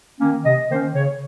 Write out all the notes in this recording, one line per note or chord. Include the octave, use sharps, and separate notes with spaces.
D#3 A#3 C#4
C3 D#5
D#3 A#3 C#4 C5
C#3 C#5